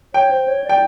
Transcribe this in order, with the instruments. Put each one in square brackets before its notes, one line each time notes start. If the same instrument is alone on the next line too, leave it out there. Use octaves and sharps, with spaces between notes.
[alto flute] C#5 [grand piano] G5
[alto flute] C5
C#5
D5
[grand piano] G5